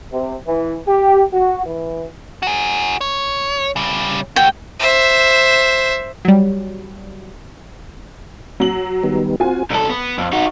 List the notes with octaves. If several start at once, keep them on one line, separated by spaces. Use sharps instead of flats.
C3
E3
G4
F#4
E3
F#4 G#4
C#5
C#3 G3
A3 F#4 G5
C5 E5
F#3 G3
F#3 F#7
D#3 G3 B3
C4 F4 F#4 G#5
C2 A4
B3
F2
D#4 F#4